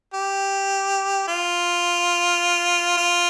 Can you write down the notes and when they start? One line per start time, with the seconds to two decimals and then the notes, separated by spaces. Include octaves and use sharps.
0.14 G4
1.27 F4
2.97 F4